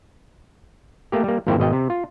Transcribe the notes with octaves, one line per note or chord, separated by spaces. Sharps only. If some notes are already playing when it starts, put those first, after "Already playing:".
A3 A#3 G4
G3 A#3
G#1 F2 A#3 E4 C5 G5
G#1 B2 D#5 G5
C3
F4